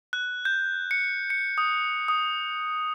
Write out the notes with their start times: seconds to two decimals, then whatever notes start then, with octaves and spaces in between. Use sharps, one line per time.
0.13 F#6
0.45 G6
0.91 C#7
1.30 C#7
1.58 D#6
2.08 D#6